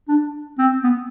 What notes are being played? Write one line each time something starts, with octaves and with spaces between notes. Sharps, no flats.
D4
C4
B3